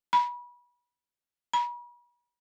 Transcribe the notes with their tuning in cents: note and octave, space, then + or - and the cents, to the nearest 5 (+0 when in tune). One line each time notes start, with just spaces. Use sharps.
B5 -25
B5 -40